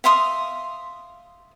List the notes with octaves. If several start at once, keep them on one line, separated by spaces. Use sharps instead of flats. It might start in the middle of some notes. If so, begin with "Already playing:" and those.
E5 F5 C6 D#6